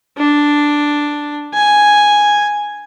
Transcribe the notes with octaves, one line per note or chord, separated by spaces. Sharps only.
D4
G#5